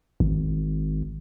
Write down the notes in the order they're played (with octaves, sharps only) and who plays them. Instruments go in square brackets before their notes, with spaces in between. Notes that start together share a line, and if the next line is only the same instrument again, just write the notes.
[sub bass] G#1